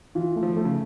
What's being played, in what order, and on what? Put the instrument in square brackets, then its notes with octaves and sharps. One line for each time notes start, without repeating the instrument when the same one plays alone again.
[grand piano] E3 [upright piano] F4
[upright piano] A3
[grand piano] F3
[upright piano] A3
[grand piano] C#3